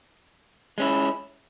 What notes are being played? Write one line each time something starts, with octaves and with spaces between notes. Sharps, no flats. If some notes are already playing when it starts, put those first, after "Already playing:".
G#3 C#4 E4